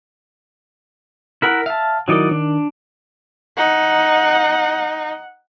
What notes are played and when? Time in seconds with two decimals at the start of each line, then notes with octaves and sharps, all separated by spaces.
1.42 E4 A#4 F#5 F6 F#6 B6
1.66 E5 F5 A5
2.08 D#3 F#3 D#4 E4 A#4 D5
2.31 D#3 D4
3.57 D#4 F#5